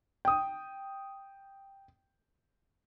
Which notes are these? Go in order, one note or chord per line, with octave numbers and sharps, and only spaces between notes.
G5 D#6